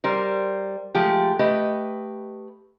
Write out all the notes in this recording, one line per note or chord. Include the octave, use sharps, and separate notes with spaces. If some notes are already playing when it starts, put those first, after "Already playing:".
G3 A#4 C5
F3 G#3 A3 G4
A3 G4 B4 D#5